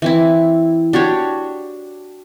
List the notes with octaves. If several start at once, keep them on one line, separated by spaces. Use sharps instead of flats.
E3 C4 E4
D4 F#4 G4 C#5